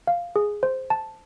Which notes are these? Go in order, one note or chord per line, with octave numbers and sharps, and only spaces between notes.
F5
G#4
C5
A5